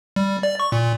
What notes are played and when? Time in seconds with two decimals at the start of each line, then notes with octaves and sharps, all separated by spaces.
0.16 G3
0.43 D5
0.60 C#6
0.72 A#2